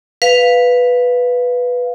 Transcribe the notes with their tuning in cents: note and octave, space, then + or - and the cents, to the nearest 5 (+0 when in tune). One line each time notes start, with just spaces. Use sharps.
B4 +0 F5 +0